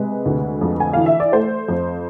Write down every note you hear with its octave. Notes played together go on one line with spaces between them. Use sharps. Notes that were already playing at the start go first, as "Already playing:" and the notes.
Already playing: C3 G#3 B4
D2
F2
G#5
E3 F5
E5
D5
A3 C5
F2